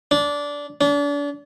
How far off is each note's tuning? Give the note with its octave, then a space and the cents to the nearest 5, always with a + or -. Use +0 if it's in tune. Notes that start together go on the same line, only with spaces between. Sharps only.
D4 -15
D4 -35